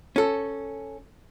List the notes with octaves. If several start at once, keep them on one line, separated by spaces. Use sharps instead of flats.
C#4 A4